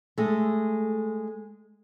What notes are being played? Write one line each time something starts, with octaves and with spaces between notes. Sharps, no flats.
G#3 A3